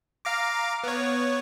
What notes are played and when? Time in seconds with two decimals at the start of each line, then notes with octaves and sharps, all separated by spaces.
0.25 F5 A#5 D6
0.84 B3 C#5